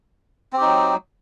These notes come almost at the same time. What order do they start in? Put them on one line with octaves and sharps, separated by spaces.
C4 G4 D#4 F#3